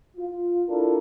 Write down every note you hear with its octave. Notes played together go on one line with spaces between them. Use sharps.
F4
D4 E4 F4 A4 A#4